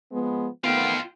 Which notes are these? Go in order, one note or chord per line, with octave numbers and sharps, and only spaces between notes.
F3 G#3 B3
D#3 A3 B3 F4 F5 G5